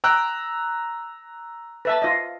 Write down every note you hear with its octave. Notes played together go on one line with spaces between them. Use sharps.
G5 A#5 E6 F#6
B4 E5 A5
F4 D#5